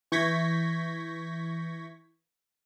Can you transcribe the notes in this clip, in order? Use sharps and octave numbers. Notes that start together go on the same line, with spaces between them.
E3 C#6 G6 G#6 A#6 B6